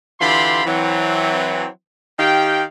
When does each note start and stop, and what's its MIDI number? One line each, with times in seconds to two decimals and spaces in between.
0.20 0.63 50
0.20 0.63 52
0.20 0.63 65
0.20 0.63 67
0.20 0.63 83
0.20 0.63 84
0.66 1.67 52
0.66 1.67 54
0.66 1.67 60
2.19 2.63 51
2.19 2.63 67
2.19 2.63 77
2.19 2.63 79